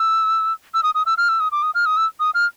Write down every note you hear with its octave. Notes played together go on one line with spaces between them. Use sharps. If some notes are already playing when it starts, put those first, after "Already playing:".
Already playing: E6
E6
D#6
D#6
E6
F6
E6
D#6
D6
D#6
F6
D#6
E6
D#6
F6